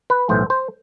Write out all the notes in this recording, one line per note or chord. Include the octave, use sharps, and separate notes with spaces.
B4
B1 A2 E3 B3 C5
C5